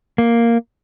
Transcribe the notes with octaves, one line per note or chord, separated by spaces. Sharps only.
A#3